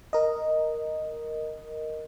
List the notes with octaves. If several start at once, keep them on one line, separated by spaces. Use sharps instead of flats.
A#4 D#5